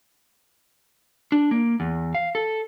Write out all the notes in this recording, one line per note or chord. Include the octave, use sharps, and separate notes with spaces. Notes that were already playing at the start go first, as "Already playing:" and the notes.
D4
A#3
E2
F5
A4